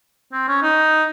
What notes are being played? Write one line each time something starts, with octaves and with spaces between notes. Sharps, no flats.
C4
C#4
D#4